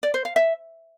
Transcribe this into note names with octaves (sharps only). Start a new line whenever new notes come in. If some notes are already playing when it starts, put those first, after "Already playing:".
D5
C5
F5
E5